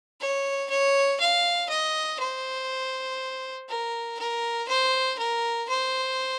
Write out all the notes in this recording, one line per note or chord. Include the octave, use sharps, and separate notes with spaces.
C#5
C#5
F5
D#5
C5
A#4
A#4
C5
A#4
C5